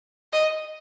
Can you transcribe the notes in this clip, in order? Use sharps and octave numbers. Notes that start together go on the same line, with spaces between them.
D#5